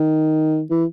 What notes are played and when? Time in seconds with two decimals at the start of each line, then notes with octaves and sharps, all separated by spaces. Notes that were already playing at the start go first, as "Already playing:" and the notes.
Already playing: D#3
0.71 E3